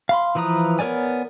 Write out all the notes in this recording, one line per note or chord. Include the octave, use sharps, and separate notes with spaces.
F5 B5 C6
E3 F3 B4 A#5 D#6
B3 A#4 C#5 D5 G#5